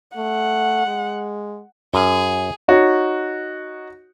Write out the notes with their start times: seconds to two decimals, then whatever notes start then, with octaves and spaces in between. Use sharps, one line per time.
0.17 A3 F#5
0.87 G#3
1.94 F#2 G#4
2.68 D#4 F#4 C#5